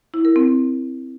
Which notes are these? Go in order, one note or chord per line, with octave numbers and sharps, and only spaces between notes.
E4
A#4
C4